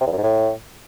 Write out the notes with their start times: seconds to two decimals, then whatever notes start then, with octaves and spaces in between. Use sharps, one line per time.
0.01 C3
0.06 E2
0.12 F#2
0.18 G#2
0.23 A2